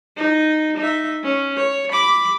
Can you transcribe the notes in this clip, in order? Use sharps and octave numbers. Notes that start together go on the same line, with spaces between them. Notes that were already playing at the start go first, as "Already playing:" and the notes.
D#4
D#4 E5
C#4
C#5
B5 D6